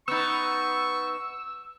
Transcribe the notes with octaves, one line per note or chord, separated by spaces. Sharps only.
B3 D#4 C#6 E6